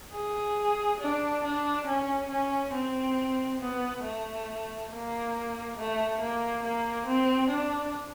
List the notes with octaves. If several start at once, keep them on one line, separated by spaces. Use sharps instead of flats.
G#4
D4
D4
C#4
C#4
C4
B3
A3
A#3
A3
A#3
A#3
C4
D4